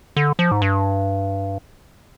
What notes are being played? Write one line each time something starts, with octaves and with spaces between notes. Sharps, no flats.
D3
F3
G#2
G2